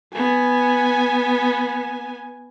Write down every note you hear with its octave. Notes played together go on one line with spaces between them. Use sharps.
B3 G#5